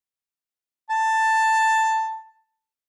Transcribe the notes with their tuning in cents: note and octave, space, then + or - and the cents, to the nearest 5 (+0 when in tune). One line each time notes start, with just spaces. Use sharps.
A5 +10